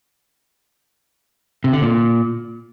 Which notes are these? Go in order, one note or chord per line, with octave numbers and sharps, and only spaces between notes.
C3
D3
A#2